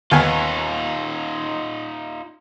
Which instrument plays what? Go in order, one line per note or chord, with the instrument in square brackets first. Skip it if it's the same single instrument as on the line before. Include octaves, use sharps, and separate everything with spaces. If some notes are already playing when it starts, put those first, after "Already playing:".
[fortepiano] D#2 B3 G#5 [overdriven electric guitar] D#4 F4